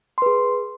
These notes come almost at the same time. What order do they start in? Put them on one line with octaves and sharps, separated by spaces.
C6 B4 G#4